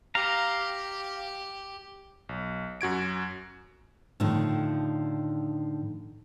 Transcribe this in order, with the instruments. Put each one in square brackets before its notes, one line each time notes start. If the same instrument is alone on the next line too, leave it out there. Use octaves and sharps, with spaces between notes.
[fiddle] G4 [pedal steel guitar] F5 A#5
[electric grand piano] B1
F#2 F#4 G#6 D7
[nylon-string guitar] A2 D3 D#3 F3